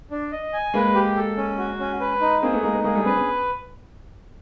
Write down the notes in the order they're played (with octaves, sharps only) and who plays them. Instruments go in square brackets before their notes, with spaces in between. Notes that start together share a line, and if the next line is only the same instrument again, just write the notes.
[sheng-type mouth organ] D4
D#5
G#5
[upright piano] G#3 A#3 [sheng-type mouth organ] B4
[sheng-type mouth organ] G4
A4
C#4
F#4
C#4
B4
D#4
[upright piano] A#3 C4 [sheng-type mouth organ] G#4
[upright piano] A3 B3
[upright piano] G#3 A#3 [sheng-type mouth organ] D#4
[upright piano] A3 B3
[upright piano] G#3 A#3 [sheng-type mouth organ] G#4
[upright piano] G3 A3
[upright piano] C4 D4 [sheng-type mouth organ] B4
[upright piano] B3 C#4